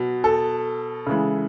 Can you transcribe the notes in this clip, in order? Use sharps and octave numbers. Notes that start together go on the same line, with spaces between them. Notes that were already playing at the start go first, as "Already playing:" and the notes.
Already playing: B2 F#3
A4
C#3 E3 G#3